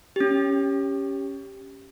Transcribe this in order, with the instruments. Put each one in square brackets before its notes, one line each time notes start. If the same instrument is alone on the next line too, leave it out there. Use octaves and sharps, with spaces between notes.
[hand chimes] C#4 G4